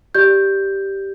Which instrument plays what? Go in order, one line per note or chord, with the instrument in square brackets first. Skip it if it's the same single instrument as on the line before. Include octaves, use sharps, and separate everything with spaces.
[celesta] G4 D5 G6